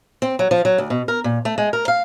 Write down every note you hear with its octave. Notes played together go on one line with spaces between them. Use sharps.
C4
F#3
F3
F#3
D2
B2
A#4
A#2
A3
G#3
A#4
F5